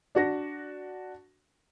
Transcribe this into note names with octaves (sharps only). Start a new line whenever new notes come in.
D4 F#4 A#6